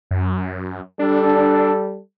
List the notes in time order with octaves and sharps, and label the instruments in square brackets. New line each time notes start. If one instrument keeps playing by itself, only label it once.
[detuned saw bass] F#2
[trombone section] G3 A4 [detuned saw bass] D4